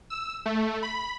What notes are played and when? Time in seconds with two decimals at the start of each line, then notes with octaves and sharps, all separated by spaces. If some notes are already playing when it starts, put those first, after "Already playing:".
0.10 E6
0.46 A3
0.83 B5